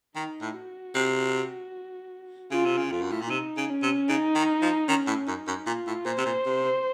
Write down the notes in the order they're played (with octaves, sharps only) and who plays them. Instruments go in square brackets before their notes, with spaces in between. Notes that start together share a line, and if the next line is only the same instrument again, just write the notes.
[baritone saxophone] D#3 [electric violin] D#4
[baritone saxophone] A2
[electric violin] F#4
[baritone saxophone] C3
[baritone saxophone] C#3 [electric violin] F4
[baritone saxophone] C3
C#3
[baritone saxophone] F2 [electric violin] F4
[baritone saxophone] F#2
A2
A#2
[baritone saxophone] C3 [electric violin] D#4
[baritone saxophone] C#3
[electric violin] C#4
[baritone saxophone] C3
[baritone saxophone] C#3 [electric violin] D#4
[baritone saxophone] D#3
F3
[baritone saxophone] D#3 [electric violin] C#4
[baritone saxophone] A2
[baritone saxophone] F#2 [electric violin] D#4
[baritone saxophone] F#2
[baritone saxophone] A#2 [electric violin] F4
[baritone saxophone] A2
[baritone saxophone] A#2 [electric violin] C5
[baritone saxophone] C3
A#2
C3